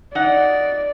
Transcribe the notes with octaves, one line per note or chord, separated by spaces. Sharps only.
D#4 D5 F#5